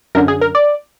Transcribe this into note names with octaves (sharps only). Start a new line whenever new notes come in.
F#2 D3 A#4
G#4
A#4
D5